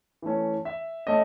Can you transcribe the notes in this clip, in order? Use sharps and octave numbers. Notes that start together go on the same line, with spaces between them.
E3 A3 C#4
E5
A3 C#4 D#5